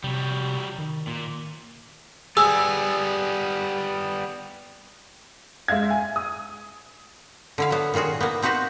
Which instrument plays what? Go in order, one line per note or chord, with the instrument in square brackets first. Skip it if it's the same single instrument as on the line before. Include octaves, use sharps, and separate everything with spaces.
[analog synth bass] C3 [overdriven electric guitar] F#3 G3
[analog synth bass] D#3
[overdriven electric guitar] A#2
[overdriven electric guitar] G3 B3 [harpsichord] G#4 [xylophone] E6
[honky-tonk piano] G#3 E5 F5 G#6
G#5
D#6
[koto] D3 E4 F5
F#3 B3
A#2 D#3 F4 F#4 G#4
A#3 B3
C4 D#4 F#4 B4 C5